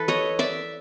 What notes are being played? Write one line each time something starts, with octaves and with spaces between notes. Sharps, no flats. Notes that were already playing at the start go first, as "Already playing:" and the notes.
Already playing: E3 A4 B4
C#5 D#5
D5 E5